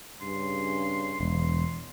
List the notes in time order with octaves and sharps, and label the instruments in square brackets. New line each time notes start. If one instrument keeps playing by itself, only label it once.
[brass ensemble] G2 C#3 [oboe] C6
[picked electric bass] E1 [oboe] C6